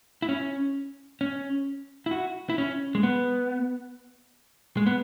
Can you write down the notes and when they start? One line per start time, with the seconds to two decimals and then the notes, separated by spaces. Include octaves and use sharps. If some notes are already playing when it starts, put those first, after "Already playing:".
0.22 E4
0.29 C#4
1.21 C#4
2.06 E4
2.11 F#4
2.50 E4
2.58 C#4
2.95 G#3
3.03 B3
4.77 G#3
4.86 B3